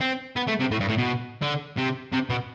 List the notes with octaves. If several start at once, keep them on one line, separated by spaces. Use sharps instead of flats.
C4
B3
A3
C3
A2
G2
A2
B2
D3
C3
C3
B2